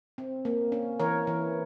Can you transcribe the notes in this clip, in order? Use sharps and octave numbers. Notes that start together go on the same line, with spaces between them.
C4
A#3
C#4
E3 A#4 C#5
E3